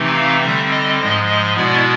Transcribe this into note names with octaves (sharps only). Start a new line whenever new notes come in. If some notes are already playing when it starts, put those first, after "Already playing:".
Already playing: C3 E3 A3 C4 D#4
F5
D3 G3 C4 E5
D#5
G#2 F3 G#3 D#5
D#5
B2 G#3 B3 E4 D5